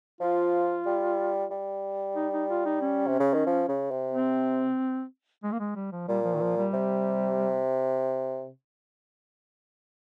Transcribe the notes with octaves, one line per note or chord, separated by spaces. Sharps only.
F3 F4
G3
G3
D#4
D#4
F4
D#4
C#4
C3
C#3
D#3
F3
C#3
C3
C4
G#3
A#3
G#3
G3
F3
A#2 G3
F3
D#3
F3
G3
C3